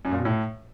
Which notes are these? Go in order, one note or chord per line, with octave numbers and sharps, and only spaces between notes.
F#2
A#2
B2
A2